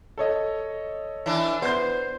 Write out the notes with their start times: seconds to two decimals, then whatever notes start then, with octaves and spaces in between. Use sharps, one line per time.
0.18 A4 C#5 D#5
1.26 E3 D4
1.62 B3 C5 G6